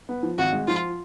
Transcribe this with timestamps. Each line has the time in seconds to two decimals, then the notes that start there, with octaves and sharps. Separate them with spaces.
0.09 B3
0.23 F3
0.38 G#1 F#4
0.53 G#3
0.68 F3 F4